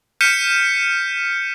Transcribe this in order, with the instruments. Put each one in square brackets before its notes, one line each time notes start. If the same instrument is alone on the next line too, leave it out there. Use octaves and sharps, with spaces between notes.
[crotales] F6 G6 B6 C#7 D#7 E7